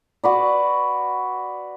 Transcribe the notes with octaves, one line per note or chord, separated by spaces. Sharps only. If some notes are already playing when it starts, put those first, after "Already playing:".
F#4 B4 D5